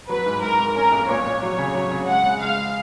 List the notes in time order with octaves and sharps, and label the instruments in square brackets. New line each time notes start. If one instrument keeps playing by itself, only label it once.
[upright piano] F#3 [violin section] B4
[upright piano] G#2
[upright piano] G#2 [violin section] A#4
[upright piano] G#2
[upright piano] C#4 [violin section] A#4
[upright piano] B1
[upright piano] A#2 [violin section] C#5
[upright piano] A#2
[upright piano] F#3 [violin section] C#5
[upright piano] C#3
F#3
C#3
[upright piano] G#3 [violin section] F#5
[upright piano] C#3
[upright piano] G#3 [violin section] F5